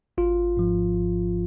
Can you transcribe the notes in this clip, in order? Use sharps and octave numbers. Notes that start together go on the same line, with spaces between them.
G#1 F4
G#2 F3
G#1